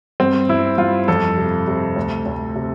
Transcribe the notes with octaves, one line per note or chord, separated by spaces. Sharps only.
G2 C4
G2 E4
G2 F4
F2 A4
C3
C3
D2
D2
C3